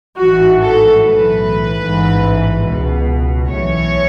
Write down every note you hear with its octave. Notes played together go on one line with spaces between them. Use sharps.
A1 G#2 E3 F#4
A4
B1 A2 E3 B4
A1 G#2 E3
C#2 B2
B1 A2 E3 C#5